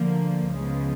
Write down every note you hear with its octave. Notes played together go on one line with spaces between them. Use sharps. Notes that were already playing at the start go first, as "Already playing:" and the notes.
Already playing: D2 D3 F3 A#3
C#2 C#3 F3 G#3 B3